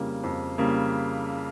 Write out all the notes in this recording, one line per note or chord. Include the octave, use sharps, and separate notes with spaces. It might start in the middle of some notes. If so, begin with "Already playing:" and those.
Already playing: F2 C#3 G3 A#3
F2
C#3 G3 A#3